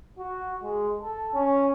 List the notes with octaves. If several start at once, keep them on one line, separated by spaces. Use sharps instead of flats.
F#4
G#3
A4
C#4